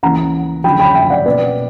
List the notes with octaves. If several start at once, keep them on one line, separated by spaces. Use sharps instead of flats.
C#2 C#3 E3 A#3 C#4 F#5 A#5
D2 C#3 F#3 G5 B5
G5 B5
E5 G5
D5 F#5
B2 A#3 C#4 B4 D5